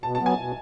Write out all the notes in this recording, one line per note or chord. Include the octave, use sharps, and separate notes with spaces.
B2 A5
A5
F#3 B3
G#5
B2